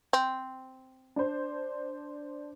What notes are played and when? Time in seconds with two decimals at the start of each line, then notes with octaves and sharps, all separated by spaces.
0.13 C4
1.16 D4 C5